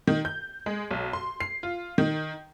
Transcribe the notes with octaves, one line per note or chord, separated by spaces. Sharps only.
D#3
G6
G#3
B1
C6
C7
F4
D#3